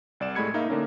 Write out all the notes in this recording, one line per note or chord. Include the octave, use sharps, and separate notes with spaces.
C2 D5 E7
A2 G#3 A3 B5 G#6 C#7
A#3 D#4 E5 F5
D3 A#3 C#4 D#4